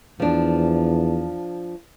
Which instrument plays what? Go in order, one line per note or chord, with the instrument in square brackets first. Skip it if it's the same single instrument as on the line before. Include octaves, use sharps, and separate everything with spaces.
[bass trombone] E2 [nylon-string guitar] F3 D4